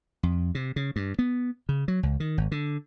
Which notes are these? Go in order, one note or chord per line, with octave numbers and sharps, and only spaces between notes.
F2
C3
C#3
G2
B3
C#3
F#3
C#2
D#3
G#1
D3